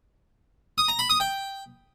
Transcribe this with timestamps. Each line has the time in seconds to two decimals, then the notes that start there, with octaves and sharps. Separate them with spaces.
0.78 D#6
0.88 A#5
0.99 B5
1.10 D#6
1.20 G5